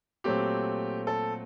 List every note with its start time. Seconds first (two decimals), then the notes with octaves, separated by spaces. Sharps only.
0.24 A#2 F#3 A3 C4 G4
1.07 A4